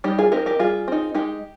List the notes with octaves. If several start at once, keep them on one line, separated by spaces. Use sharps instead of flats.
G3 D#4 G4
F4 G#4
C4 D#4 G4 A#4
G4 A#4
G3 F4 G#4
C4 D#4
G#3 D#4 G4